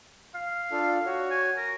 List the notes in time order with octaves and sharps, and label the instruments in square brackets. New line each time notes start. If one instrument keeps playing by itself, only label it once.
[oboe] F5
[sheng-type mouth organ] D4 F4 A4
F#4 C#5
[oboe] G#5
A#4